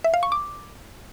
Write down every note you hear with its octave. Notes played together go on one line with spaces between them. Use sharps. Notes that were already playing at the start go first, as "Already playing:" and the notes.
E5
F5
C#6
D6